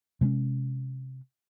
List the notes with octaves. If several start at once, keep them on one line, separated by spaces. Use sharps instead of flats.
C3 G#3 C4 C#4